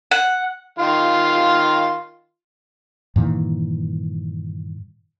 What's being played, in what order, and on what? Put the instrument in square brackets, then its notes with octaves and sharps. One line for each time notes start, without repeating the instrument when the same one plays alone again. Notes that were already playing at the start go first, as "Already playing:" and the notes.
[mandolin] F#5
[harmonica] D#3 F4 F5
[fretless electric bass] G2 A#2 D#3 E3